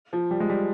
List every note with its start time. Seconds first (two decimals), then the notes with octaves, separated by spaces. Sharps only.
0.13 F3
0.31 G3
0.40 G#3
0.50 G3